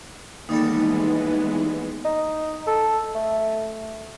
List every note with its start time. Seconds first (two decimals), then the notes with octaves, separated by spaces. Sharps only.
0.49 D#2 E3 G3 G#3 B3 D#4 A4
2.04 D#4
2.67 A4
3.15 A3